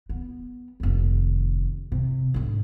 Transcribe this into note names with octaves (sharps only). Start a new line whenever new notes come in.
B3
F1 D#2
C3
G#2 D3